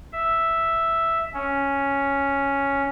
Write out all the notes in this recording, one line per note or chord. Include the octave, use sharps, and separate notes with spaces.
E5
C#4